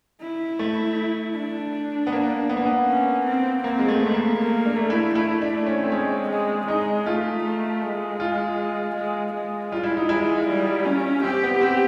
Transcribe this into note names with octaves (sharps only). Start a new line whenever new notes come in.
E4
A3
D4
B3
A#3
B3
A#3
B3
C#4
C4
A#3 C4
G#3
A3
A3 B3
A#3
A#3
D4
A3
E4
A3 E4
D4
A3
C#4
C4
G#3 C#4
G#3
G#3 D#4
A3 F4
A3
G#3
F4
G#3
G#3
G3 F4
E4
D#4
G#3 E4
G3
C#4
C4 G4
B3
C4